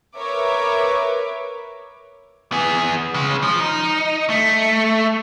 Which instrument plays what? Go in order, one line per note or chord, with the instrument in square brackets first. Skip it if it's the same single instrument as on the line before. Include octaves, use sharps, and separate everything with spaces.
[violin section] A#4 B4 C#5 E5 D6
[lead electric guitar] B3 G#4
C#3 G#3
F3
D#4
A3